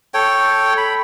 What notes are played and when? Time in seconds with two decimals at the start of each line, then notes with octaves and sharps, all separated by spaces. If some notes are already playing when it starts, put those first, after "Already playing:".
0.14 A4 C#5 G5
0.78 B5